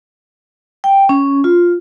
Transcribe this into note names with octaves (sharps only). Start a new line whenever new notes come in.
G5
C#4
F4